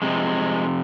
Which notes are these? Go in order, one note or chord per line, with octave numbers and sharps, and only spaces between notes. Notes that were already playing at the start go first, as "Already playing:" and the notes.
F2 C3 F3 G#3